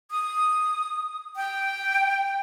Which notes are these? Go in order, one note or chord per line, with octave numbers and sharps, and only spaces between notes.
D#6
G5